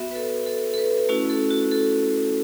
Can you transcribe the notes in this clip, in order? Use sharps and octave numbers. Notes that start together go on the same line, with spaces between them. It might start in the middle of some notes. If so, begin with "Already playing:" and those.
Already playing: B3 F#4 E5
B4
A4
A4
A4
B4
A3 C#4 E4 F#4
A4
F#4
A4